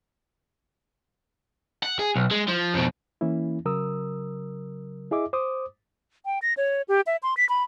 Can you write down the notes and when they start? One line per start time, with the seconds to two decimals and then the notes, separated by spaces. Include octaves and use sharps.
1.83 F#5
1.99 G#4
2.16 B1
2.31 G#3
2.48 F3
2.74 F2 B2
3.21 E3 A#3 C#4 E4
3.65 C#3 F#3 A#4 D#6 E6
5.11 E4 G#4 D#5 E5 D6
5.33 C5 D6 D#6
6.26 G5
6.42 A#6
6.57 C#5
6.88 G4
7.07 E5
7.23 C6
7.37 B6
7.49 B5